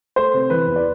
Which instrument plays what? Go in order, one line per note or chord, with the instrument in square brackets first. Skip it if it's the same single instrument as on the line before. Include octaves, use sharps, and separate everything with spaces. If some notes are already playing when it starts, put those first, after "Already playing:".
[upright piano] A3 C5
C3
E3 B4
E2
D5